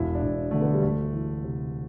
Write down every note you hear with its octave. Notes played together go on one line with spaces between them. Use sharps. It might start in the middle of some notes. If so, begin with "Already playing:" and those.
Already playing: E1 E4
D4
E1
D3 A3
B3
G3
D2 A3
E3
C3